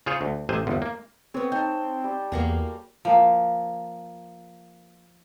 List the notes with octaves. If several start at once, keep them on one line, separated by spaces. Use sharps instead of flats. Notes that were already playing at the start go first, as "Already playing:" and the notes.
C#3 F4 G#4 C5 C#5
D2
A1 C3 C5 G#5
G1 E2
A#3
B3 C4 G#4 C#5
D#4 G5 A5
G3
E2 A#3 F#4 G#4
F3 A#3